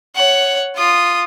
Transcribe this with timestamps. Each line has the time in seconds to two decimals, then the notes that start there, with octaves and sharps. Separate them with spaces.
0.16 C#5 F#5
0.76 F4 D#6